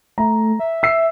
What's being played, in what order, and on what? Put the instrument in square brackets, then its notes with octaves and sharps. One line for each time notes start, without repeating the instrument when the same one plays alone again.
[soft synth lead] A3 [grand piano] A#5
[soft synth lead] E5
[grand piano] E6 C7